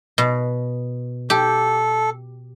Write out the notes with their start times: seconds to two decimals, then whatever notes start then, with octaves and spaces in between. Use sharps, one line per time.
0.18 B2
1.30 G4 A4